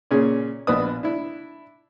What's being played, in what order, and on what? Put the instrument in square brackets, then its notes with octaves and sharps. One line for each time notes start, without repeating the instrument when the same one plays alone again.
[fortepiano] A#2 C#3 C#4 G#4
A#1 B2 D4 B4 D#6
D4 E4